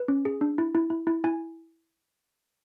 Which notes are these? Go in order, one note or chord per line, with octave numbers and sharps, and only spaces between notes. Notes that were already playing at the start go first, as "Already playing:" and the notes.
Already playing: B4
C#4
G#4
D4
E4
E4
E4
E4
E4 G#5